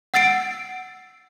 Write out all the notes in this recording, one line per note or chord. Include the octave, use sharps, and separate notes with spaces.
F#5 E6 A6 C7 D7